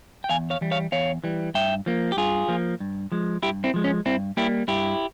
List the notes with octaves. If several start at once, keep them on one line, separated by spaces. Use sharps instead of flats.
G5
E2 F5 G#5
C#5 F5
E3 G3
C#5 F5
E2 C#5 F5
E3 G3
G2 E5 G5
F3 A#3
G4
G2 F4 G#4
F3 A#3
G2
F3 G#3
G2 E4 G4
C4 E4
F3 G#3
C#4
G2 C4 E4
G3 A#3 E4 G4
G2 E4 G4